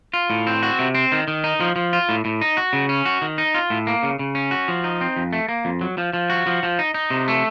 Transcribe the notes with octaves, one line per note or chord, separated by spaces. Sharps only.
F4
A2
C4
F#4
C3
C4
D#3
D#3
D#4
F3
F3
F4
A2
A2
D#4
F#4
C#3
C#4
F#4
D#3
D#4
F4
A2
A#3
C#3
C#3
C#4
F#4
F3
D#4
C4
F2
A3
A#3
F2
F#3
F3
F3
F#4
F3
F3
D#4
D#4
C3
A3